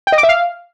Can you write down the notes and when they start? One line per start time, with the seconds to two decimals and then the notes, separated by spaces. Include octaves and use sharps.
0.07 G5
0.12 D#5
0.18 D6
0.23 E5
0.29 F5